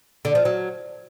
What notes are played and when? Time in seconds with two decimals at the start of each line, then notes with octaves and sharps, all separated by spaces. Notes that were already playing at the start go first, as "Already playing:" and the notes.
0.25 D3
0.35 F3
0.45 F#3